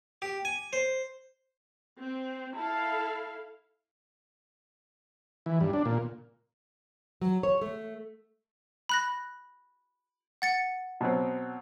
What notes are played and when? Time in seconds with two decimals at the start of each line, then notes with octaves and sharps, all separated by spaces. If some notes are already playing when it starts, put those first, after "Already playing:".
0.22 G4
0.45 G#5
0.73 C5
1.98 C4
2.56 E4 A4 F5 A5
5.46 E3
5.61 G2
5.73 D4
5.86 A#2
7.21 F#3
7.43 C#5
7.61 A3
8.89 B5 F#6 A#6
10.42 F#5 A6 C#7
11.01 B2 F#3 C4